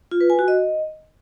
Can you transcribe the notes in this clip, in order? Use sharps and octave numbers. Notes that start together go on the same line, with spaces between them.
F4
B4
G#5
F#4
D#5